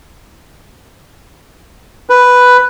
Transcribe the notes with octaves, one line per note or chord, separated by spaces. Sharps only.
B4